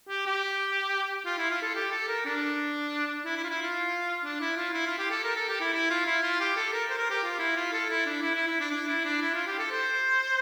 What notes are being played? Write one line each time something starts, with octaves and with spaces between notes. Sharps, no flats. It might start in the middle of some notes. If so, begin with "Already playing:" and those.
G4
G4
F4
E4
F4
A4
G4
A4
A#4
D4
E4
E4
F4
E4
F4
D4
E4
F4
E4
F4
G4
A4
A#4
A4
G4
E4
E4
F4
E4
F4
G4
A4
A#4
C5
A#4
G4
F4
E4
F4
A4
E4
D4
E4
E4
E4
D4
D4
E4
D4
E4
F4
G4
A4
C5